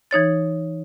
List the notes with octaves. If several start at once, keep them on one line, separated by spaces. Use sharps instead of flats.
E3 D#4 C#5 A6